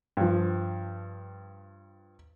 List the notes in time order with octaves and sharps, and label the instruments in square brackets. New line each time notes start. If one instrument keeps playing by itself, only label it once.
[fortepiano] G2 F3